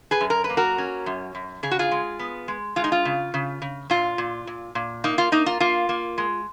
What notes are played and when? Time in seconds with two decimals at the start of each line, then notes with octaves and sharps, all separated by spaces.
0.11 G#4 B4
0.21 F#2
0.30 A#4
0.44 B4
0.50 A#3
0.57 F#4 A#4
0.78 C#4
1.06 F#2
1.35 F#2
1.63 C#3 G#4
1.71 F#4
1.79 F4 G#4
1.91 G#3
2.19 B3
2.48 G#3
2.76 G#3 F4
2.84 D#4
2.92 F4
3.05 C#3
3.34 C#3
3.62 C#3
3.90 A#2 F4
4.18 A#2
4.47 A#2
4.75 A#2
5.04 A#3 D#4
5.18 F4
5.32 A#3 D#4
5.46 F4
5.60 A#3 F4
5.89 A#3
6.18 G#3